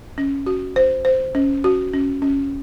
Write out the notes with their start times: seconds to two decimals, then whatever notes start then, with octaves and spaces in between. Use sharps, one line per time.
0.18 C#4
0.46 F#4
0.76 C5
1.05 C5
1.35 C#4
1.64 F#4
1.93 C#4
2.22 C#4